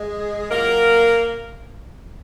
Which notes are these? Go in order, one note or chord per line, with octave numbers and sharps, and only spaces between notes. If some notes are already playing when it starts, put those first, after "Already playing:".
Already playing: G#3 G#4
A#2 F#3 A#3 A#4